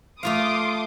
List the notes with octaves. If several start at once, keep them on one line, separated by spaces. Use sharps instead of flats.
A3 F4 F5 C6 D6 D#6